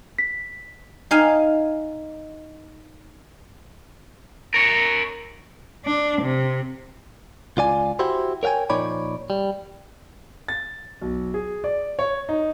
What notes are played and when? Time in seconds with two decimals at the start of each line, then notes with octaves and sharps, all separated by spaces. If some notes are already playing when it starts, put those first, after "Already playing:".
0.18 B6
1.11 D#4 F5 G#5
4.54 A#4 C#5
5.86 D4
6.22 C3
7.57 C#2 F4 D5 G#5
7.99 E4 F#4 G4 C5
8.43 A#4 C#5 F5 G5 G#5
8.70 A#2 F3 D#4 C#5 D5 B5
9.30 G3
10.48 A6
11.01 B1
11.34 G#4
11.64 D5
11.99 C#5
12.29 D#4